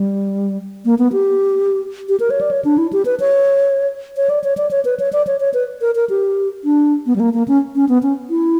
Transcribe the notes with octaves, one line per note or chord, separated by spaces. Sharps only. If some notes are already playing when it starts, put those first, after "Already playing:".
Already playing: G3
A#3
B3
G4
G4
A#4
C#5
D5
C#5
D4
E4
G4
B4
C#5
C#5
D5
C#5
D5
C#5
B4
C#5
D5
C#5
C#5
B4
A#4
A#4
G4
D4
B3
G3
A#3
A#3
C#4
C#4
B3
C#4
E4